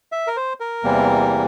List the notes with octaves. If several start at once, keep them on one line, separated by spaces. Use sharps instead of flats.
E5
A#4
C5
A#4
E2 C3 E3 G3 A#3